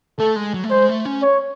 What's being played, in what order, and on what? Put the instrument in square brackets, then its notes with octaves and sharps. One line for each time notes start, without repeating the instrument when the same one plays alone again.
[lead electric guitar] A3 [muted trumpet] A4
[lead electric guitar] G#3
F#3
A3
[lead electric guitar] G#3 [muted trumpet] C5
[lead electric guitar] A3
C#4
[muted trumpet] C#5